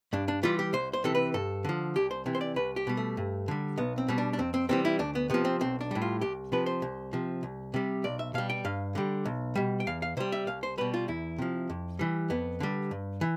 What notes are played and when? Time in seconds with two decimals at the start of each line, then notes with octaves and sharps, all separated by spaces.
0.13 G2 D4
0.28 D4
0.43 E3 G3 F4
0.59 G4
0.73 C2 C5
0.93 C5
1.04 C3 E3 A4
1.15 B4
1.34 G2 A4
1.65 D3 F3
1.96 C2 G4
2.11 C5
2.26 C3 E3
2.35 C5
2.41 D5
2.56 C2 B4
2.76 G4
2.87 B2 G3
2.97 A3
3.17 G2
3.48 D3 G3
3.78 B1 B3
3.98 C4
4.08 B2 G3
4.18 D4
4.33 D4
4.39 F2 C4
4.54 C4
4.69 C3 E3 G3 C4
4.85 E4
4.99 D2 D4
5.15 B3
5.30 C3 F3 B3
5.45 C4
5.61 B1 C4
5.81 D4
5.91 A2 G3
6.02 F4
6.21 C2 G4
6.52 C3 F3 B4
6.66 C5
6.82 C2
7.13 C3 F3
7.43 C2
7.74 C3 G3
8.04 B1 D5
8.19 E5
8.34 B2 G3 F5
8.50 G5
8.65 G2 F5
8.95 D3 G3
9.26 B1
9.55 B2 G3
9.80 G5
9.87 E2 F5
10.02 F5
10.17 C3 G3 C5
10.32 E5
10.47 C2 F5
10.63 C5
10.78 B2 G3 B4
10.94 F4
11.08 E2 E4
11.38 C3 F3
11.70 F2
11.99 E3 G3
12.30 F2 B3
12.60 D3 G3
12.91 G2
13.21 E3